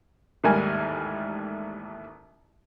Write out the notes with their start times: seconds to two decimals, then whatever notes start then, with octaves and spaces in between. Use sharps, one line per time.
0.44 A1 D#2 G#2 G3 A#4 G#5